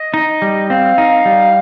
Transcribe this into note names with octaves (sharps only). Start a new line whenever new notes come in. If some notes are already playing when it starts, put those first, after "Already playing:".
Already playing: D#5
D#4
G3
C4 F5
D#4
G3